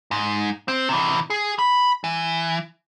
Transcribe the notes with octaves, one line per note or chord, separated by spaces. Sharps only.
G#2
C4
C3 E3
G#4
B5
E3